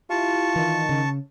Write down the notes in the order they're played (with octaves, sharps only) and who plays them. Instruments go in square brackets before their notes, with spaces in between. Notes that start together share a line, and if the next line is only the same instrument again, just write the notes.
[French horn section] E4 G4 [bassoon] F4 [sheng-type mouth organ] A5 C#6
[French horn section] D#3 [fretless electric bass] E3
[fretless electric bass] C#3